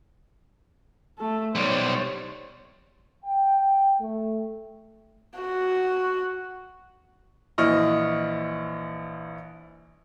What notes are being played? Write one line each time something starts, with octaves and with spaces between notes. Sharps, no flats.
A3 A4
B1 G3 C5 C#5
G5
A3
F#4
A#1 E3 E4 D#5 C#6 F6